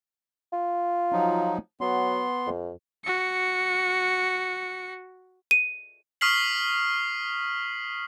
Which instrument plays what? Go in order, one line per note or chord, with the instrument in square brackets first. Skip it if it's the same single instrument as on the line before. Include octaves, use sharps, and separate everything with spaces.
[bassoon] F4
[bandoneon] F3 F#3 D#4
[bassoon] F#3 [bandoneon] B3 C6
[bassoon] F2
[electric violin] F#4 C#7
[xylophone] D#7
[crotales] C#6 D#6 F6 B6 C7 F#7